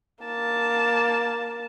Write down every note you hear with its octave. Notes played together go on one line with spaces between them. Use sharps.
A#3 A5